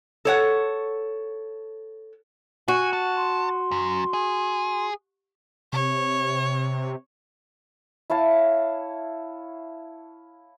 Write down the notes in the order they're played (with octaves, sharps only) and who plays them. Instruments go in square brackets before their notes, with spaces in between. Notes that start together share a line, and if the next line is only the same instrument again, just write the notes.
[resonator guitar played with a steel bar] A4 C#5 F#5
[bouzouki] F#4 [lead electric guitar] G#5
[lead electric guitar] A5
[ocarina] C6
[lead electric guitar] F#2
G#4
[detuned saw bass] C3 [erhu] C#5
[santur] E4 C#5 F5 A5